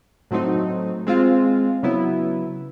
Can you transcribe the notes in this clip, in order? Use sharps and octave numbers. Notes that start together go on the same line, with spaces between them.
A2 F#3 A3 C4 D#4
G#3 C4 F4
C#3 F#3 B3 E4